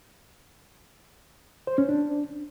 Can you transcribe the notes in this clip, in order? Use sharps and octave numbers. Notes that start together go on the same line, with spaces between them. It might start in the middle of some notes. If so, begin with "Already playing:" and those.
C5
C#4
D4